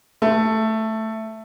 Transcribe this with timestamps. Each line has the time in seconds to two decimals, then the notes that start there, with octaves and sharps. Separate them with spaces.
0.22 A3